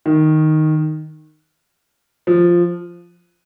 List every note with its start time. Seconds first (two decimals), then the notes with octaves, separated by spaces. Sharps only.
0.06 D#3
2.27 F3